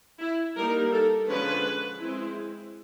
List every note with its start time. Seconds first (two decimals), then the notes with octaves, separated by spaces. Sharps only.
0.20 E4
0.56 G3 A#3 D#4 A#4
0.92 A4
1.27 D3 F3 G#3 C#4 B4
1.99 G#3 C4 E4